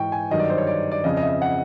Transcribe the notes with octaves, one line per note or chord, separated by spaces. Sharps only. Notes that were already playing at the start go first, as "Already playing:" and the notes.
Already playing: G#2 E3 G5 C#6
G#5
G2 D#3 F#3 D#5
D5
C5
C#5
D5
D5
F2 C#3 F3 D#5
D#5
E5
F#5